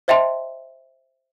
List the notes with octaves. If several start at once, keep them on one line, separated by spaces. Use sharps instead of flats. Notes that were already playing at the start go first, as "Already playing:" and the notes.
C5 D#5 E5 G5 A5 C6